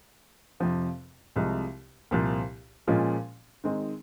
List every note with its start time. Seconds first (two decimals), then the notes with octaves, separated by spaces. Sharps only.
0.60 F2 C3 F3 C4
1.36 C2 C3 F3 G#3
2.11 C2 A#2 F3
2.87 A#2 F3 G#3 C#4 F4
3.64 D#3 G#3 C4 D#4